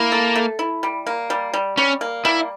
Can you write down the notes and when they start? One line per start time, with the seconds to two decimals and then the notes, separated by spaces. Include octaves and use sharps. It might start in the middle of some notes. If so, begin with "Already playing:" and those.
Already playing: A#3 E4
0.12 A4
0.36 A3
0.59 E4
0.83 G3
1.07 A#3
1.30 G3
1.54 G3
1.77 G3 C#4
2.01 A#3
2.25 G3 E4